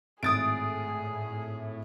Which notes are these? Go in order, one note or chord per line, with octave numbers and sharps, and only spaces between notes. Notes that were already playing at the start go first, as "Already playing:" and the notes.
G#1 A2 G#4 D#6 A6 D7